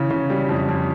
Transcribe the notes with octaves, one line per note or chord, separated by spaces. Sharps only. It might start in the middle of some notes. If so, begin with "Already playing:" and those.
Already playing: C#3 E3
C#3
G3
F2
F2